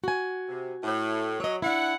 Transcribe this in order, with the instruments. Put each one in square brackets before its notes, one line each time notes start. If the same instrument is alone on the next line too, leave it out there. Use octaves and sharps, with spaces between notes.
[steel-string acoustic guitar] F#4 G#5
[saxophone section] C3
A2
[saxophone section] F#3 [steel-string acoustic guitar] C#5 D#5
[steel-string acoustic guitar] D4 E4 [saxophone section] F#5